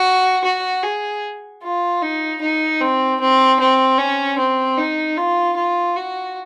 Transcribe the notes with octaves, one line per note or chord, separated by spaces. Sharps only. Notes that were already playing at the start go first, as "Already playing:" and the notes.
Already playing: F#4
F#4
G#4
F4
D#4
D#4
C4
C4
C4
C#4
C4
D#4
F4
F4
F#4